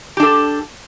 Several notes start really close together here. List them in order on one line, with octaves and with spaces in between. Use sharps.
G4 D4 A4